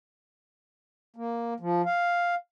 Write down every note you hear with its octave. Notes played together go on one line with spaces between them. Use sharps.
A#3
F3
F5